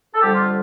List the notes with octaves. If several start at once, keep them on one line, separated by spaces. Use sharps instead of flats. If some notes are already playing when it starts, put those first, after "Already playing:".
A4
F2 D3 G3 G4
F4